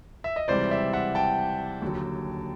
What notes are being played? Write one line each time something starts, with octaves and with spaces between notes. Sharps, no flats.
E5
D#5
C#2 C3 E3 G3 C5 D5
D5 E5
E5 F#5
G5 A5
D#2 D3 F#3